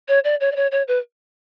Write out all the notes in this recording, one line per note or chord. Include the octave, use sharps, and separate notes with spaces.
C#5
D5
C#5
D5
C#5
C#5
B4